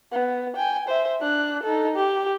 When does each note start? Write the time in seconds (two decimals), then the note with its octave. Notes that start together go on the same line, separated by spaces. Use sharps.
0.12 B3
0.56 G5 G#5
0.88 C5 E5
1.21 D4 F#6
1.63 D#4 A4
1.96 G4